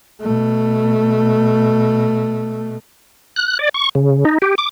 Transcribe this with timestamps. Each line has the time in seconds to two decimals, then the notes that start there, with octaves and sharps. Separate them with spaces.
0.21 B2 A3
3.36 F#6
3.59 D5
3.74 C#6
3.95 C#3
4.25 D#4
4.42 G4
4.58 D6